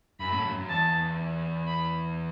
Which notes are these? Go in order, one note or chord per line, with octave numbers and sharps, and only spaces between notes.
F#2 B5
A2
F#2
F#2
E2 A5
B5